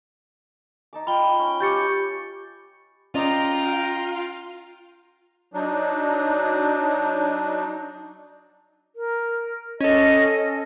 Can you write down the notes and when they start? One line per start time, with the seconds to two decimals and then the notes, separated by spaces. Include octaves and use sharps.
0.93 D#4 A5 D6
1.07 F4 G5 B5 G7
1.39 C#4 C#5
1.61 G4 F5 C#6 G6 A6 C#7
3.15 C#4 F4 D5 D#5 G5 A#5
5.54 F#3 D4 D#4
8.96 A#4
9.81 C#4 A4 D#5